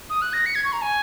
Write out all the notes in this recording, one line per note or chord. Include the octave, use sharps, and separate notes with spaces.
D#6
F#6
A#6
C#7
G#6
C#6
A#5
G#5